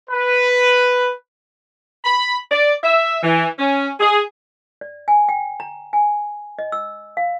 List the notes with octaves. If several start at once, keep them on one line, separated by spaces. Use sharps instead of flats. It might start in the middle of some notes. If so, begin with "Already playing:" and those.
B4
B5
D5
E5
E3
C#4
G#4
D5
G#5
G5
A#5
G#5
D#5
E6
F5